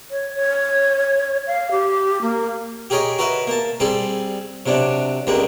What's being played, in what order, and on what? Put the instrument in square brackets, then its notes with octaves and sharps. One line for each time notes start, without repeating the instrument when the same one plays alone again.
[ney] C#5
C#5
F5
G4
A#3
[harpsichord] G4 G#4 A#4 C#5 D#5
F#4 A#4 B4 D#5 E5
A#3 A5
G3 C4 G#4 A4
C3 F#3 D4
C#2 G3 G#3 A#3